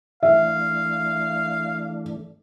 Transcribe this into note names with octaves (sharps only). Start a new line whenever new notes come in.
E3 A3 D4 E5 F5